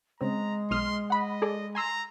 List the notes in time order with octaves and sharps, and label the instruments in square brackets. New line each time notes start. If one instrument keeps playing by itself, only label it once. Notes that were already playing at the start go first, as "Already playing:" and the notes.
[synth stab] C#3 C4 [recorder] G#3 [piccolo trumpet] A#5
[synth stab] B1 D#6 F6 [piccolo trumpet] C6
[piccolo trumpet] D#5 [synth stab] F#5 B5
[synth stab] G#4 A4 D5
[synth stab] G#5 C6 E6 [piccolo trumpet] A#5